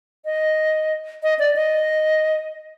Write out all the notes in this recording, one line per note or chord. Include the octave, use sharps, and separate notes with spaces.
D#5
D#5
D5
D#5